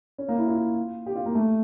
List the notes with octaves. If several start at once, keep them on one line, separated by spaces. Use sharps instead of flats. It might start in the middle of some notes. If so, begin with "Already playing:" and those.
C#4
A#3
E4
F4
G4
F4
A#3
A3